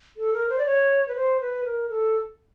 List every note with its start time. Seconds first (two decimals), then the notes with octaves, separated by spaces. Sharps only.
0.17 A4
0.33 A#4
0.49 C5
0.58 D5
0.66 C#5
1.08 B4
1.16 C5
1.41 B4
1.65 A#4
1.90 A4